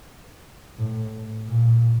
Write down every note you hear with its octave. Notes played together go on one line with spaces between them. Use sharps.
A2
A#2